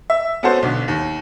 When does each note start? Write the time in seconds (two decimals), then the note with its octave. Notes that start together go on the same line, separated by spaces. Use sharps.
0.10 E5
0.43 B3 C#4 F#4 A4 C5
0.63 B1 D3
0.88 D#2